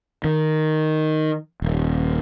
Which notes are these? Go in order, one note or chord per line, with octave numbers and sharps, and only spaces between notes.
D#3
D#1